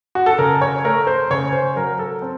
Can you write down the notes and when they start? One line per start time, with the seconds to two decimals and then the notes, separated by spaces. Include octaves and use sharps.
0.15 F#4
0.26 A4
0.39 C#3 A#4
0.62 C#5
0.84 A3 A#4
1.07 C5
1.31 C#3 C#5
1.53 C5
1.76 F#3 A#4
1.99 A4
2.22 C4